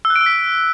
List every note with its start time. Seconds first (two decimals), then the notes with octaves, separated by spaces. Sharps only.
0.05 E6
0.10 F#6
0.16 D7
0.21 E6
0.26 B6